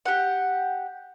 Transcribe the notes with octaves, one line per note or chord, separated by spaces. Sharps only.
G4 F#5